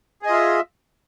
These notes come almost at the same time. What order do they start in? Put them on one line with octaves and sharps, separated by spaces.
G#4 D#5 F4 E5